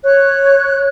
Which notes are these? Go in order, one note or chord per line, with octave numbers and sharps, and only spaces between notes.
C#5 F#6